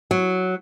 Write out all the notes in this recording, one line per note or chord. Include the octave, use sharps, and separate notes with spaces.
F#3